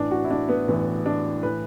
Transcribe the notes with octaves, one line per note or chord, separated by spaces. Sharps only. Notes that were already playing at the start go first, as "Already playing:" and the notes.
Already playing: A1 A2 E3 D4
F#4
E4
D4
B3
A1 A2 E3 B3
D4
A2 E3 B4